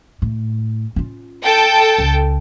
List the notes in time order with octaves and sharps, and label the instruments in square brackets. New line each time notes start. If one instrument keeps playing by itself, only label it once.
[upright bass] A2
C#4 F4
[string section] A4 G5 A5
[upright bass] C#2